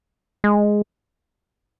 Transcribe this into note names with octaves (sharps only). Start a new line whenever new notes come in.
G#3